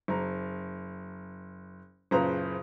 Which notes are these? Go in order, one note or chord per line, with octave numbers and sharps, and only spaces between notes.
F#1 A#5
F#1 A#2 C#3 B4 C5 A#5